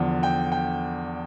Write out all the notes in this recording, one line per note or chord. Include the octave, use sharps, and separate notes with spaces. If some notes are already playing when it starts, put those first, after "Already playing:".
Already playing: E2 D3 F3
G5
G5